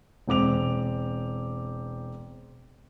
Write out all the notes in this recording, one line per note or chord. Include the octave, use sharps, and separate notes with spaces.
E1 C4 D6 F7